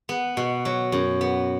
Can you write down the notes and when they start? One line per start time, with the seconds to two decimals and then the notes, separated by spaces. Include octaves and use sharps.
0.09 B3
0.37 B2
0.65 F#3
0.92 F#2
1.21 B3